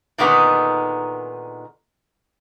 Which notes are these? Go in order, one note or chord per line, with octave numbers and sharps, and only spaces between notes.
A#2 D3 D#3 G#3 B3 D#4